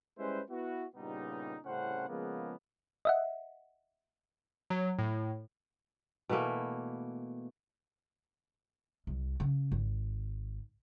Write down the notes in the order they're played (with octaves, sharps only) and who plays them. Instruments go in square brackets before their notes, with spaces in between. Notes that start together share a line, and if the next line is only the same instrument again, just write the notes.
[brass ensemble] G3 G#3 C#4 E4 B4 C5
B3 E4 F#4
G2 A#2 C#3 G3 B3 D#4
C2 A2 C#3 C#4 C5 F#5
C#3 F3 G#3 A#3 B3
[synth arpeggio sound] D#5 E5 F#5
[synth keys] F#3
A2
[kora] B2 E3 A3 A#3
[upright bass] C2
C#3
G#1